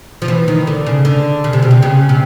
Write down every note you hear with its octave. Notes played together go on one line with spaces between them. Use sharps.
F3
E3
D#3
D3
C#3
D3
C#3
C3
B2
C3
C#3
C3